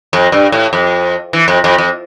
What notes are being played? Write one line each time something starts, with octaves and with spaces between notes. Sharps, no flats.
F2
G2
A2
F2
E3
F2
F2
F2